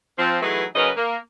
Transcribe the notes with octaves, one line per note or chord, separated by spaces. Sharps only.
F3 C4
E3 F#3 A3 D#4 G#4 B4
C#3 F#3 C#4 A#4 B4 D#5
A#3